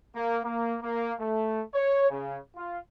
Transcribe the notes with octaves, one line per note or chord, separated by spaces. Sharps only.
A#3
A#3
A#3
A3
C#5
C#3
F4